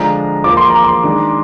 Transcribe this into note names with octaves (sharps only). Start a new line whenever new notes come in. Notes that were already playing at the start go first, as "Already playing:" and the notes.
Already playing: D3 F3 G#3 D4 F4 A#5
F3 A#3 F4 D6
C6
A#5
C6
D#3 G#3 D4